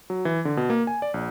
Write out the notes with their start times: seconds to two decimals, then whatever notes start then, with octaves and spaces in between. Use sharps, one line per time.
0.10 F#3
0.25 E3
0.45 D3
0.57 B2
0.70 A#3
0.87 G#5
1.02 D5
1.14 A#1